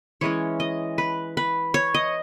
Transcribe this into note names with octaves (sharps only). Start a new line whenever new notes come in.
E3 G#3 C#4 C#5
D#5
B4
B4
C#5
D#5